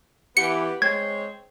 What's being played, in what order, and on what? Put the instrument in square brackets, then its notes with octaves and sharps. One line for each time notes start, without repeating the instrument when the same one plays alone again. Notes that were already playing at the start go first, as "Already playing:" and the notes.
[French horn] E3 [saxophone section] B3 G4 [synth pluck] C#7
[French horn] G#3 [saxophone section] C4 C5 C#5 [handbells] G#6